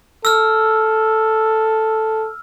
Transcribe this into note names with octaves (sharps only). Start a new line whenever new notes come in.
A4 E6 F6